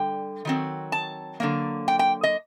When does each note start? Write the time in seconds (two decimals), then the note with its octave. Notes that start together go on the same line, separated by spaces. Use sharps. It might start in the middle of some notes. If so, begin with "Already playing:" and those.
Already playing: D3 G3 G5
0.45 D#3 F#3 C4
0.92 A5
1.40 D3 F#3 A#3
1.88 G5
1.99 G5
2.23 D#5